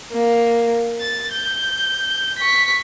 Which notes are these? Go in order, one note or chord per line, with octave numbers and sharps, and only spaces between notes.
A#3
A6
G6
C#6 B6